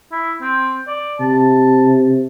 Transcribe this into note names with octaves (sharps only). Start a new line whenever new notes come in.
E4
C4
D5
C3 A5